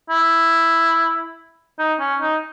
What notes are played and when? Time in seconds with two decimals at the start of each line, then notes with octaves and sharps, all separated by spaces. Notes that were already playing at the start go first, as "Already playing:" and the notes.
0.10 E4
1.79 D#4
2.00 C#4
2.21 D#4